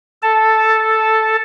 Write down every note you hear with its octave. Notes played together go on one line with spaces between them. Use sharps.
A4 A5